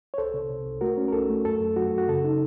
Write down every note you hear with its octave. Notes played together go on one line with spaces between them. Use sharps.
C#5
C2 A4 C5
C3
C3
C2
A3 F#4 A#4
C#4
A#4
C2 A4
A3
F#2 A4
F#2
F#2 F#4
F#2
F#4
C#3 A4
D#4